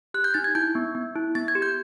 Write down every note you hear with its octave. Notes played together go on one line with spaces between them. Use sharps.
G4 F#6
G6
D#4 A6
G#6
E4 G6
B3
B3
E4
B3 A6
G#6
G4
G6